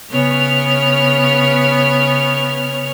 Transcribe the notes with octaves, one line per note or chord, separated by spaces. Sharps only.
C#3 B3 C#5 F6